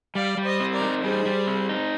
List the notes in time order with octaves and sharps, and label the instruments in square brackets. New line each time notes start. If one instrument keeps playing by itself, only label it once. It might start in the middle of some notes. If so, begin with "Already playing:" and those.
[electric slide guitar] G3 [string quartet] D5 F5
[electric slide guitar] G3
[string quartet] C5 D#5
[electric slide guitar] C4
[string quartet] A#4 D5
[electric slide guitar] D#4
[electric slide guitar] G3 [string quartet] G#4 C5
[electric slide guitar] G3
C4
D#4